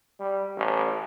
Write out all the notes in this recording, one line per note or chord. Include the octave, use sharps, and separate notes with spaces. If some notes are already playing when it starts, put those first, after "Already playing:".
G3
A1